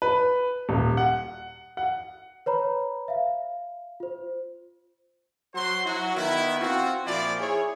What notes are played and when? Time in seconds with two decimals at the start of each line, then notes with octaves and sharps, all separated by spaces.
0.02 B4
0.69 D#1
0.97 F#5
1.77 F#5
2.46 B4 C#5 A#5 B5
3.08 E5 F5
4.00 F4 C5
5.54 F#3 F#4 C5 C6
5.85 F#3 E4 F#4
6.16 D#3 B3 E4
6.60 C4 F4 F#4
7.05 A#2 F3 E4 F4 D5
7.40 E4 G#4 C#5